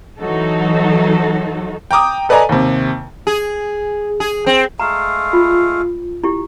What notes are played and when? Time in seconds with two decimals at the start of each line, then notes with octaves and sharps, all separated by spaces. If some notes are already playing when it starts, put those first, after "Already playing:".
0.18 E3 F#3 D#4 F#4 A4
1.91 G5 A#5 D6 D#6
2.29 A4 B4 D5 D#5 G#5 A#5
2.49 D#2 C3
3.27 G#4
4.20 G#4
4.46 C4
4.79 G#3 A3 F5 A#5
5.33 F4
6.23 E4 G4